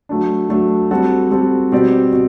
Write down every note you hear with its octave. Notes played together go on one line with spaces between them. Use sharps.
F#3 A3 D4
F#3 A3 D4
G3 C4 F#4 A4
G3 C4 F#4 A4
B2 G3 C4 G4 D5
B2